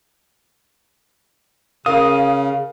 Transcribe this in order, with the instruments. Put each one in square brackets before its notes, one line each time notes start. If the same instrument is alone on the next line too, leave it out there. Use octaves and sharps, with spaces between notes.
[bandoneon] C#3 [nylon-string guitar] A#4 D#5 [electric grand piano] F5 [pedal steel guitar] D#6